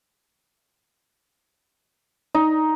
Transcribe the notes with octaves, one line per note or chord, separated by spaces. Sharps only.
D#4